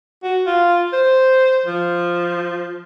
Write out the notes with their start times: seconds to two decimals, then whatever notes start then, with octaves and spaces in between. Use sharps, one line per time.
0.23 F#4
0.47 F4
0.93 C5
1.66 F3